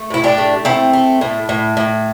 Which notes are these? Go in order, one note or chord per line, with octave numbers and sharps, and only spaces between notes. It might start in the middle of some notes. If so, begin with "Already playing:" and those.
Already playing: A3
A2 E4
D4 G4
A3
A3 C4 E4
A3
A2
A2
A2